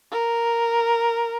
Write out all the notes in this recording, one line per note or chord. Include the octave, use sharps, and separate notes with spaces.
A#4